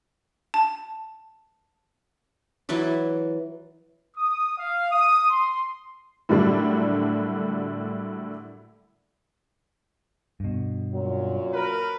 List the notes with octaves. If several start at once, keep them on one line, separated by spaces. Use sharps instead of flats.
A5
E3 F#3 B4 D5
D#6
F5
D#6
C6
A2 D3 F#3 G3 A#3 D4
G2 B2
F#2 A#2 F#3
A#4 B4